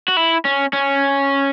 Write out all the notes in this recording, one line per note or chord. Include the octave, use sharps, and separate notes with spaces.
F#4
E4
C#4
C#4